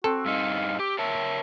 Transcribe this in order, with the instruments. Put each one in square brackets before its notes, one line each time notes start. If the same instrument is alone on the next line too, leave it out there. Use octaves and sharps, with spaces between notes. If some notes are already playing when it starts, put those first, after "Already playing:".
[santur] C4 [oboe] F#4 [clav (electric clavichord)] A4
[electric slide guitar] G2 D#4 [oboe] F5
[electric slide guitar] G4 [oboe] D6
[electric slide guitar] A#4 C#5 A5 [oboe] E5